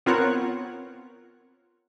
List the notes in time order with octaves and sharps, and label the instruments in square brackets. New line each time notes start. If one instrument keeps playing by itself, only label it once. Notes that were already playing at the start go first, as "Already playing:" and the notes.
[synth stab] B3 C4 F4 A#4 C#5 F#5